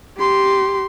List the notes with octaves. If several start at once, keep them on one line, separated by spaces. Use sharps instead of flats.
G4 C6